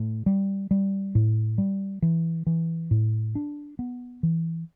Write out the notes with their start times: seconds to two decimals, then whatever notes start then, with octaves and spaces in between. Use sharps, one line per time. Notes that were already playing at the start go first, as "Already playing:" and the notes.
Already playing: A2
0.26 G3
0.71 G3
1.15 A2
1.58 G3
2.02 E3
2.47 E3
2.91 A2
3.35 D4
3.79 B3
4.23 E3